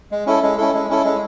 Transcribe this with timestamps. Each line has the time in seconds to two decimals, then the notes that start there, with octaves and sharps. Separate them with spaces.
0.12 G#3
0.26 C#4 E4 A4
0.42 G#3
0.58 C#4 E4 A4
0.74 G#3
0.90 C#4 E4 A4
1.04 G#3